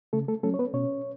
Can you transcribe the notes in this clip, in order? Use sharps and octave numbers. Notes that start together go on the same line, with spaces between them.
C#3 A3 A4
A3 A4
F#3 A3 C#4 A4
C#5
B3 B4
B2 C#4 C#5